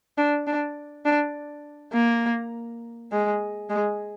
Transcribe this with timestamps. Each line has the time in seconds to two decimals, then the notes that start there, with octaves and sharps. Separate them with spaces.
0.18 D4
0.47 D4
1.05 D4
1.93 A#3
3.12 G#3
3.70 G#3